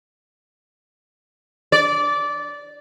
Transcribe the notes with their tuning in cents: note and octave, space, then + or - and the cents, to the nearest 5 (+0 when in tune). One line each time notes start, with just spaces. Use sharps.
D5 -15